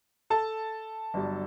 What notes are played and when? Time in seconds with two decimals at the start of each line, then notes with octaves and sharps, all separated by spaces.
0.30 A4 A5
1.14 G1 G2 F#3